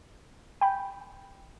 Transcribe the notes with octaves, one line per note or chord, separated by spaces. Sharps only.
G5 G#5 B5 G6